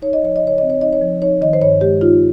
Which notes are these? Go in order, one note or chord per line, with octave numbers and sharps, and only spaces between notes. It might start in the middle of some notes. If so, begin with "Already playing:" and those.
D#4 C#5
D#5
F3 C#5
D#5
C#3
C#5
C4 D#5
C#5
D#4 D#5
C#5
F3
D#4 C#5
D#3 D#5
C5
G2 C#5
G#3 G4
D#4 F4